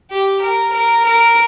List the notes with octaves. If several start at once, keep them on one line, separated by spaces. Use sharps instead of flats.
G4
A#4
A#4
A#4